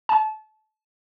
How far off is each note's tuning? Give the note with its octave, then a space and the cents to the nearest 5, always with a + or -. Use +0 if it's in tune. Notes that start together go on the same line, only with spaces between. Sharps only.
A5 -25